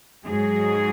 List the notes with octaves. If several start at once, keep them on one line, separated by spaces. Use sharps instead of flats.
G#2 F#3 G#4